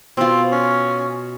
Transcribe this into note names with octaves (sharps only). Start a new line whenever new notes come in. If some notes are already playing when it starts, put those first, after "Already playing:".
B2 C4 F4
C#4